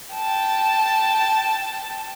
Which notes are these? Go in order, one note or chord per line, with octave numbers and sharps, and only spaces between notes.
G5 A5